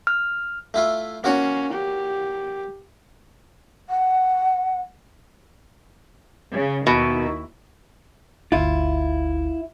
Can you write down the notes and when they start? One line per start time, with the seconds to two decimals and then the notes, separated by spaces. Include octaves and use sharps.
0.07 F6
0.74 A3 E4 F4
1.24 A#3 C#4 F#4 C#5
1.73 G4
3.90 F#5
6.53 C#3
6.87 D#2 B2 D#3 E4
8.52 G1 D2 E4 F4